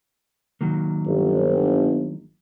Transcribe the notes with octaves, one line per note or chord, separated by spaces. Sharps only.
D#3 F#3 A#3
G1